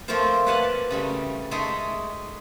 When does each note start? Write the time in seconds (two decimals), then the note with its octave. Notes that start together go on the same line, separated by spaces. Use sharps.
0.08 F3 A3 A#3 C4 F4 C5
0.46 B4 D5 F5 F#5 G#5 A5
0.91 C#3 G3 A3
1.51 G#3 A3 D#4 G#4 A4 E5